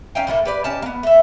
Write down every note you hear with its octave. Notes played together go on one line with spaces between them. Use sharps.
C#4 D#4 F5 G5
A2 F3 A3 A#3
G4 B4 D5
C#4 D#4 G5 A5
A#3 B3
A3 E5